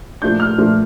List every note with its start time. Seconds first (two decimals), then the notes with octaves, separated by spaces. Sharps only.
0.22 A#2 F3 A3 D4 G6
0.40 F6
0.58 A#2 F3 A3 D4